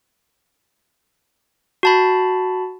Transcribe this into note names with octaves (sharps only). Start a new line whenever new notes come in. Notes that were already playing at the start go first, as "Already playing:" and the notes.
F#4 A5 B5